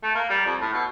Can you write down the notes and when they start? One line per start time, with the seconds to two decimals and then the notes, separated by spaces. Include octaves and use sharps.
0.03 A3
0.15 A#3
0.30 G3
0.45 F2
0.60 A2
0.74 B2